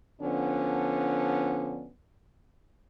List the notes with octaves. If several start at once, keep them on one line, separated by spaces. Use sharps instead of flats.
D3 F3 B3 C#4 D4